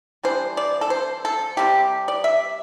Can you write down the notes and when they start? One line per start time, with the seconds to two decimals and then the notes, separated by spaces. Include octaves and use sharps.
0.23 E3 G3 D4 C5
0.57 D5
0.81 A4
0.90 C5
1.25 A4
1.57 C3 G3 C4 G4
2.08 D5
2.24 E5